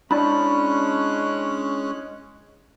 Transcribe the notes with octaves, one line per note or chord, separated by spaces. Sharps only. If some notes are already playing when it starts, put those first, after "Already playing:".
G#3 C#4 D4 E4 D5 A5 B5 F#6